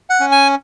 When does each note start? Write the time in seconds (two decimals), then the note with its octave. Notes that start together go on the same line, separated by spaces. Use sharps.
0.10 F#5
0.20 C#4
0.32 G#5